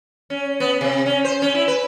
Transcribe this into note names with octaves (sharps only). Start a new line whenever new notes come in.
C#4
B3
C3
C#4
C5
C#4
E4
B4